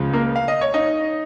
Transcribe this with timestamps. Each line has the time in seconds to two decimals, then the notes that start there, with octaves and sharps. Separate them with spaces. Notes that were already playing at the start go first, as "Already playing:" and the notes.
Already playing: C#2 C#3 F3
0.13 A#3 A#4
0.36 F5
0.48 D#5
0.61 C#5
0.74 D#4 D#5